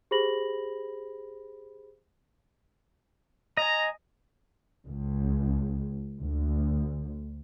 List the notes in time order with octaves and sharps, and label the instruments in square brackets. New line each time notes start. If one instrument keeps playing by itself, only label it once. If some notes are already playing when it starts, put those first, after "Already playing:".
[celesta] G4 G#4 C5 B5 A#6 F#7
[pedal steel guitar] D#5 G#5 [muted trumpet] A#5
[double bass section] C#2
D2